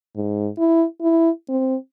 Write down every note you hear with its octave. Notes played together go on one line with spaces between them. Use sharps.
G#2
E4
E4
C4